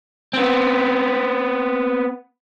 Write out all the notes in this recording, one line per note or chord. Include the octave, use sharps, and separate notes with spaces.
B3 C4